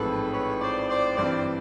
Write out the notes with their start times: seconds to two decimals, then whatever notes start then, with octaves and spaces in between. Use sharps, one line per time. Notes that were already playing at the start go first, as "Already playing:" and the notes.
Already playing: A1 G#2 F3 G#3 C4 A4 B4
0.32 B4 C#5
0.61 C5 D5
0.89 C5 D5
1.17 G2 E3 G3 C4 C5 D5